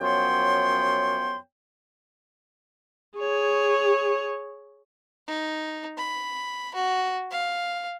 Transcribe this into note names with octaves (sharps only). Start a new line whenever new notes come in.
F#2 F3 B3 C#5 G5 C6
G#4 C#5
D#4
B5
F#4
F5